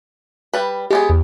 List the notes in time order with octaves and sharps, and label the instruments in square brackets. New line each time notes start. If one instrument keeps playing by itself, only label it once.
[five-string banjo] G3 B4
[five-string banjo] G#3 B3 G#4 [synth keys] G4
[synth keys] E2